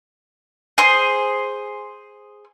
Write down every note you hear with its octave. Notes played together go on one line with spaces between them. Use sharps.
G#4 C5